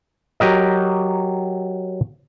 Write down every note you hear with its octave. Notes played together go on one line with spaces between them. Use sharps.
F#3 G4 A#4 D#5